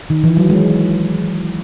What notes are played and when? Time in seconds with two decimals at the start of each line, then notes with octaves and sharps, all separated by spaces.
0.10 D#3
0.24 E3
0.37 F#3
0.50 G#3